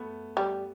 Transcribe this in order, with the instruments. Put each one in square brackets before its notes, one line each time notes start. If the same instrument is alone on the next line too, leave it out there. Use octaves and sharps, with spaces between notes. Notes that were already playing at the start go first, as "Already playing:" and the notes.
Already playing: [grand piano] A3 B3
[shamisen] G3